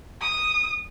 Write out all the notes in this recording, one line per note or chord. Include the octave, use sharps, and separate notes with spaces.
D#6